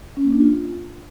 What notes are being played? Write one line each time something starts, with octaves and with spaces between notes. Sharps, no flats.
C#4
A#3
D4
F4